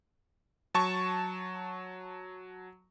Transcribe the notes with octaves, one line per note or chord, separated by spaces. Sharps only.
F#3 A5 C#6